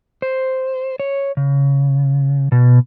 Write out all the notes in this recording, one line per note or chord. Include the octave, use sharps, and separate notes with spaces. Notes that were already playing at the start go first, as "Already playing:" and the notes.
C5
C#5
C#3
B2